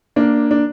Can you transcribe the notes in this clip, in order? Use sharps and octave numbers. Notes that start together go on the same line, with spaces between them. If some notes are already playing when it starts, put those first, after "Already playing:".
A#3 D4
D4